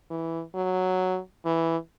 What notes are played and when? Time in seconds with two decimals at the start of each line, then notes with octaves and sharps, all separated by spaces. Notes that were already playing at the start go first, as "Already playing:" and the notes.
0.10 E3
0.55 F#3
1.45 E3